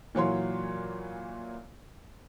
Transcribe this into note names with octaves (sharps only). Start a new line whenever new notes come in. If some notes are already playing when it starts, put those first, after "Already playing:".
A#2 E3 F#3 C#5 F5 C6